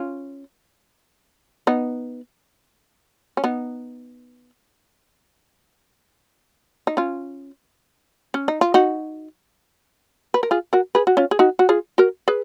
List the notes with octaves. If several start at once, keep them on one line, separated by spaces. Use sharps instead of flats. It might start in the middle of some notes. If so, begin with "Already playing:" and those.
Already playing: C#4 F4
B3 D#4
C#4
B3 D#4
D#4
C#4 F4
C#4
D#4
F4
D#4 F#4
B4
A#4
F4 G#4
F#4 A#4
G#4 B4
F#4
C#4 F4
G#4
D#4 F#4
F#4
F4 G#4
F#4 A#4
G#4 B4